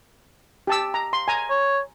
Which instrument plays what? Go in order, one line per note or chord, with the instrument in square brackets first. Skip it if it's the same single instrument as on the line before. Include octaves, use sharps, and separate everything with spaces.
[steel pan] G4 A5 E6
A#5
C6
G#5 A#5
[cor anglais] C#5